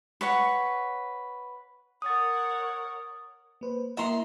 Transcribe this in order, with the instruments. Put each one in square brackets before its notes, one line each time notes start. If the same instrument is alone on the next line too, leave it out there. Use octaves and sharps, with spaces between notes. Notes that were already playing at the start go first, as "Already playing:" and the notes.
[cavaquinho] B4 C#5 F#5
[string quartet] A#4 C#5 F#5 [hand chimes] D#6 A6
[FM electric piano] A#3 B4 C5
[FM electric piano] A#3 E4 D#5 [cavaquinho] E5 A#5 C6